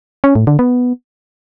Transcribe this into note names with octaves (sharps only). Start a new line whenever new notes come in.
C#4
A2
D3
B3